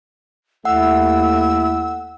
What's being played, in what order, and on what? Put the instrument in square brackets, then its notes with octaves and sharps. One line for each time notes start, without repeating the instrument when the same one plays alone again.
[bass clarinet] D#2 [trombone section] A3 E4 [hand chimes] F#5 [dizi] E6